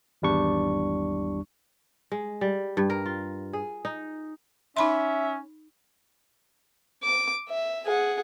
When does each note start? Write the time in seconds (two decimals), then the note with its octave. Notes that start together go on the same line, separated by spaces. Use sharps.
0.22 G#1 E2 G3 D4 C#6
2.12 G#3
2.41 G3
2.77 G2
2.90 A#4
3.06 F4
3.53 G#4
3.85 D#4
4.77 C#4 D#4 E5 B5 C6
7.03 D6
7.49 E5
7.86 G#4 F#5